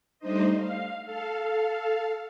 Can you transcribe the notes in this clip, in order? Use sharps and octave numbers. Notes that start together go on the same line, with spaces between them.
G3 A3 D4 D#4 C5 D#5
F5
A4 F5